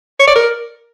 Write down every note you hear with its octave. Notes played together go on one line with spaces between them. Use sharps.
C#5
D5
A#4